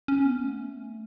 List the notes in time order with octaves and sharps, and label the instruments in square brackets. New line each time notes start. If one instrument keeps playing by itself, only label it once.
[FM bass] C#4
B3
A3